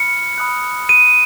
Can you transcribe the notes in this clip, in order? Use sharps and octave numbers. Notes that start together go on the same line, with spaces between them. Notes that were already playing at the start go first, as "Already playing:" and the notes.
Already playing: B5 F6 C#7
B5 D#6 F#6
D#7